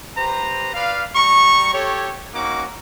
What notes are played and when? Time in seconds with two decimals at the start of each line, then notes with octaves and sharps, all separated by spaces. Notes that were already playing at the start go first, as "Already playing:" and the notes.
0.17 G4 B4 C5 A#5
0.74 B4 D5 F5
1.16 G3 A#5 C#6
1.74 G4 A4 C#5
2.34 A#3 C#4 D#4 F#4 D6